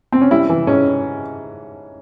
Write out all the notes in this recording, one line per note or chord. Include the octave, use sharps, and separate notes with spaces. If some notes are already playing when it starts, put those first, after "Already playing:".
C4
C#4
G3 E4
E3
G#2 C#4